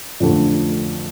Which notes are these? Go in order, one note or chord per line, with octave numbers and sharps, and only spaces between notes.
F2 D3 A3